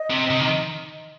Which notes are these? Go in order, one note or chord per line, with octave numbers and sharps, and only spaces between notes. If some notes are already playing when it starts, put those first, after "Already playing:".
Already playing: D#5
C3
C3
D#3